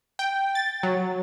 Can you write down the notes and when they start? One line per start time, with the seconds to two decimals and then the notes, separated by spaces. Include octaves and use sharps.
0.19 G5
0.55 A6
0.83 F#3